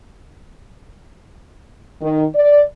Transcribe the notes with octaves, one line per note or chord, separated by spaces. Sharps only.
D#3
D5